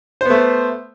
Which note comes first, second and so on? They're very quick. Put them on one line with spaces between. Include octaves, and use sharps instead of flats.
C5 B3 A3